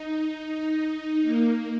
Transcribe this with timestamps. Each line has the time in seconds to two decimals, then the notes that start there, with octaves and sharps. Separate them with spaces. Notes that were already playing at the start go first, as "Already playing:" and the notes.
Already playing: D#4
1.21 A#3